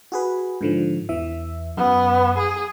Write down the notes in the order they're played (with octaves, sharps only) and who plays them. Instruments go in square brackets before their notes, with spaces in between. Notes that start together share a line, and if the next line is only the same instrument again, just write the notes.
[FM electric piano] F#4 G#4 B4
G#2 D3 F3
E2 E3 E5
[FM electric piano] F#2 [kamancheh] B3
[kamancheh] G#4